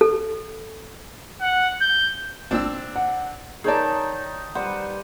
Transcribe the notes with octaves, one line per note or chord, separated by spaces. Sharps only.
A4
F#5
G6
G#1 A#2 C4 D4 E6
F#5
D#3 D#4 G#4 C#5 D5 A5
G3 B4 C5 F#5